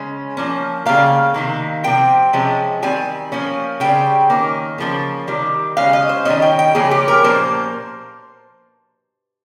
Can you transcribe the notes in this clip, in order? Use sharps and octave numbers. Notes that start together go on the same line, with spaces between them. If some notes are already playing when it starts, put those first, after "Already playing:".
Already playing: C#3 G#3 C#4
F3 A#3 C#4
C#3 G3 A#3 F5
C3 D#3 A#3
C3 F3 C4 G5
C3 F3 G#3 C#4
D#3 G3 C4 G#5
F3 A#3 C#4
C#3 G3 C4 G5
D#3 A#3 C#4
C#3 F3 A#3 C#4
C3 D#3 G3
C#3 G#3 C#4 F5
D#5
C5
D#3 G3 C#4 D#5
G5
G5
C#3 F3 A#3 C#4 G#4
G4
A#4
A#2 F3 A#3 C#4 C5